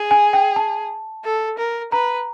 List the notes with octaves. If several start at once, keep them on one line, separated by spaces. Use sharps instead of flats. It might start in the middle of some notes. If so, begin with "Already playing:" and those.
Already playing: G#4
G#5
G5
A5
A4
A#4
B4 A#5